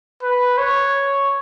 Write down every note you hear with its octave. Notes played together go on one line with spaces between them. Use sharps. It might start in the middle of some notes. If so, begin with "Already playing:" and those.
B4
C#5